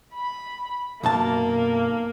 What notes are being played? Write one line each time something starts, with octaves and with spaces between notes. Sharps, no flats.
B5
B1 F#2 A#3 A5